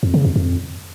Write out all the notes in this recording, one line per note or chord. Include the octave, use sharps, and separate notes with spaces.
F2
C#3
F2
F2